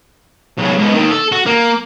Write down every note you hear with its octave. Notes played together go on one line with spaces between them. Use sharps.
B1 C#3
G#2 B3
D#2 D#3
A4
F#4
A#3